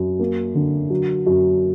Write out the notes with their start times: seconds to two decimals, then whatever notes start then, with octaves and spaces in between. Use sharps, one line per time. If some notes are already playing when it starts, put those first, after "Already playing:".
Already playing: F#2
0.19 A#3
0.55 D3
0.90 F#3
1.26 F#2